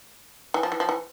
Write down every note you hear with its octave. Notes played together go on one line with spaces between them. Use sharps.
E3
F3
E3
F3
E3